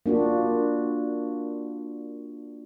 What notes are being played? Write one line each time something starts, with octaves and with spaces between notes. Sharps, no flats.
A#3 D4 F4 F#4